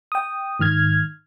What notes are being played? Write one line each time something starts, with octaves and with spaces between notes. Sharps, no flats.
G5 D#6
G#2 D#3 F6 G#6